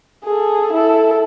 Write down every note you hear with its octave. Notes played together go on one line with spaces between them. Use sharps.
G#4 A4
E4 A4